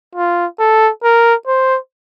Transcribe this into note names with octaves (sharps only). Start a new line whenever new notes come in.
F4
A4
A#4
C5